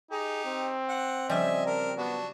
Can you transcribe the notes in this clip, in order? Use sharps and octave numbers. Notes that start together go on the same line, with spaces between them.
D#4 G4 G#4
C4
F#5
C#3 F3 G3 D#5 E5 G#5
D4 A#4
F#3 B3 D4